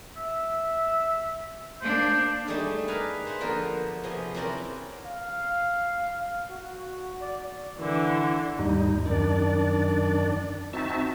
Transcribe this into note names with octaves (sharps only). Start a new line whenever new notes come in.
E5
A#3 D4 C5
G3 A3 D4 D#4 G#4 A4
G#4 A#4 B4 F5 G#5
B4 C5 E5 F#5
D3 F3 A#3 B3 F4 A#4
C3 F3 B3 F#4 G#4
C4 C#4 E4 F#4 A#4 D5
F5
F#4
D5
D3 E3
D#2 G#2 G3 D#4
F#2 D#3 D4 D5
C4 D#4 F#4 E5 A5